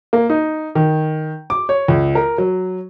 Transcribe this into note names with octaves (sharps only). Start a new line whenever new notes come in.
A#3
D#4
D#3
D6
C#5
C#2
A#4
F#3